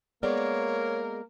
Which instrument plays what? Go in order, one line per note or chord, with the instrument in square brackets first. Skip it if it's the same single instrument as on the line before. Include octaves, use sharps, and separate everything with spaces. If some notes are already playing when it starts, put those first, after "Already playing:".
[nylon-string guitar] G#3 B3 D5 [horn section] A#3 A#4 [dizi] C#5